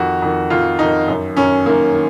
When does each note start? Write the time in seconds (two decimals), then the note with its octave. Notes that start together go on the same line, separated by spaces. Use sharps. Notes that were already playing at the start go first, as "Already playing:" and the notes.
Already playing: F2 D#3 F#4
0.22 F2 D#3
0.50 F2 D#3 F4
0.79 F2 D#3 D#4
1.08 F#2 D#3
1.37 F#2 D#3 C#4
1.66 F#2 D#3 A#3
1.94 D#3